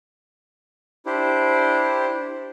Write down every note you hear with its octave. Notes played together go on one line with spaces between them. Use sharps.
D4 E4 G4 C5